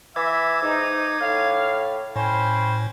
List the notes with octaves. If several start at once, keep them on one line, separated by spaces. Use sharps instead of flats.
E3 E5 D6 G#6
G#2 D#4
A2 F5
A2 C#4 C5 G5 B5